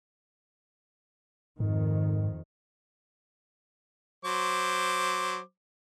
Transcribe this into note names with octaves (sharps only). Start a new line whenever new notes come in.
F2 G#2 D#3
F#3 C5 D6